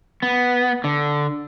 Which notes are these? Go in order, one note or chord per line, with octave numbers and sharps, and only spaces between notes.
B3
D3